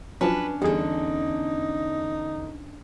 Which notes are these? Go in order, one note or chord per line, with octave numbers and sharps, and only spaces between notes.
F3 F#3 C#4 D4 B4 A5
E2 D3 G3 D#4 G#4